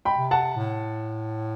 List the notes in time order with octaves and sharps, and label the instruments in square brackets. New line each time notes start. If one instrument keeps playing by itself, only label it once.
[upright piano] G5 B5
[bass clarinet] C3
[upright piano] F#5 A5
[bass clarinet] A2